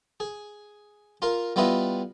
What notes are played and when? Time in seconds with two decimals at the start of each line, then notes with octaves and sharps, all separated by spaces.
0.20 G#4
1.22 F4 A#4 C6
1.56 G3 B3 E4 F4 B4 D#5